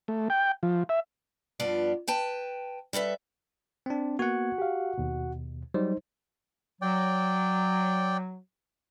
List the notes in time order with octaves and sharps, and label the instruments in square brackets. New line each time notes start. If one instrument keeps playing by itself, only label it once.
[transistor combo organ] A3
G5
F3
E5
[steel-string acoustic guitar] G2 F3 B3 F4 D5
B4 G5 A5
G3 A4 B4 E5
[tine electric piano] C4 D4
[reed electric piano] A#3 B3 G#6 [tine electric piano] F#4 F#5
[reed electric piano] G4 F5
D#2 B2
[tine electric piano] F#3 G3 [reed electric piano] D#4 C5
[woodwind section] F#3 [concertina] D5 G5